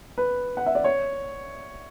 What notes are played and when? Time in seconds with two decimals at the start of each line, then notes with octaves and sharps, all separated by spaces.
0.18 B4
0.57 F#5
0.66 E5
0.75 D5
0.84 C#5